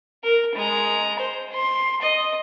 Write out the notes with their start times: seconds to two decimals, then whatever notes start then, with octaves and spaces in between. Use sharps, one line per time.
0.24 A#4
0.55 G#3 A#5
1.19 C5
1.52 C6
2.01 D#5